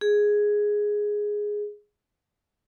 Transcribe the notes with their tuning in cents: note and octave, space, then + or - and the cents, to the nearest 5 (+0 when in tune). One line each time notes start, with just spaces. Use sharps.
G#4 +0